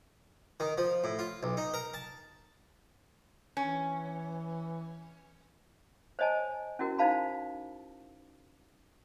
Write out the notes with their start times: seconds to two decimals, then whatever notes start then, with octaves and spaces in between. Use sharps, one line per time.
0.60 D#3
0.78 F3
1.04 A2
1.19 F4
1.43 B1
1.57 D#4
1.74 A#4
1.94 A5
3.57 E3 C#4
6.19 C5 C#5 D#5 G#5 A5
6.79 C#4 E4 F#4 A#4
6.98 D#4 E4 C5 F5 A5 B5